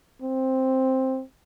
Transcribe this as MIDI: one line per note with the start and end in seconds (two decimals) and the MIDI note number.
0.22 1.22 60